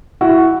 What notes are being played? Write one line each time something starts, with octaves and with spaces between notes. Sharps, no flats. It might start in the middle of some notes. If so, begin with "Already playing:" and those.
E4 F#4